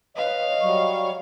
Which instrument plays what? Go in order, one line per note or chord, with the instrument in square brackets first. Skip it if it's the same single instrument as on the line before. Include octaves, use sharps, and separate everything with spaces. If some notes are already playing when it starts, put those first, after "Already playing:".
[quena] B4 [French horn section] C#5 D#5 [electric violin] F5
[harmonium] F#3 G3 [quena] C#6